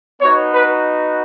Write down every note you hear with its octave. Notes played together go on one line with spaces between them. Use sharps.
B3 D#4 F#4 C#5
B4